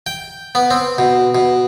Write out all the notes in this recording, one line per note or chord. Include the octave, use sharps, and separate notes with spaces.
G5
B3
C4
B2
B2